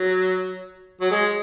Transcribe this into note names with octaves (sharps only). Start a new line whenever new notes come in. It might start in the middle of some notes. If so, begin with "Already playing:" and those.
Already playing: F#3
F#3
G#3